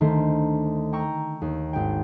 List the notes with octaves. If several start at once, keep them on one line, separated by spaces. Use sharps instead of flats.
D2 D#3 A3 C5
G5 A#5 C#6 E6
D#2
G#1 G5